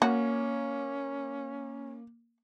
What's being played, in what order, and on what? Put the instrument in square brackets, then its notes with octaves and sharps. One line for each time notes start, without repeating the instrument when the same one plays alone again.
[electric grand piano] A#3 [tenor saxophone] C#4 [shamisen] F#4